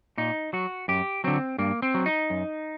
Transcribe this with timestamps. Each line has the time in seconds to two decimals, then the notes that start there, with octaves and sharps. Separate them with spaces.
0.18 A#2 D#4
0.53 F#3 F#4
0.88 F#2 G4
1.24 D3 F#3 C4
1.58 G2 A#3
1.82 C4
1.94 F#3
2.06 D#4
2.30 F#2